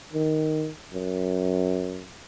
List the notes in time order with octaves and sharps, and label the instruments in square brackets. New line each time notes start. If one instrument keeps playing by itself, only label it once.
[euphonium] D#3
F#2